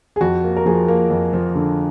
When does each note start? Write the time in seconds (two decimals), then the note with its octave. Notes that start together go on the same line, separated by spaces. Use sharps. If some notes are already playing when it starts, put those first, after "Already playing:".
0.16 G#4
0.21 F2 F#4
0.44 A#3
0.57 A#4
0.66 F3 G#4
0.88 A#3
1.10 F2
1.33 F3
1.55 D3